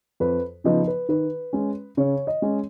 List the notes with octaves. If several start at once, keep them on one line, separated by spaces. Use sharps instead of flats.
F2 B4
C#3 F3 B3 D#4 D#5
B4
D#3 B4
G#3 C#4
C#3 C#5
D#5
G#3 C#4